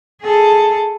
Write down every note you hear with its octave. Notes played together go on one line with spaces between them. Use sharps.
G#4 A4